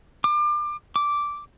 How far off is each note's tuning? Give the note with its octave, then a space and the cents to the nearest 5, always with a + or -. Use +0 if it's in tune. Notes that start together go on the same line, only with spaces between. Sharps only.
D6 +30
D6 -5